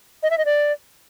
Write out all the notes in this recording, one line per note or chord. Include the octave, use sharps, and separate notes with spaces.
D#5
E5
D#5
D5